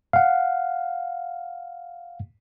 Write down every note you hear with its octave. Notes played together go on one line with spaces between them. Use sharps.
F5 F#5